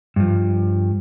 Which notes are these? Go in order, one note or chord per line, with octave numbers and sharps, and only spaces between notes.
G2 F3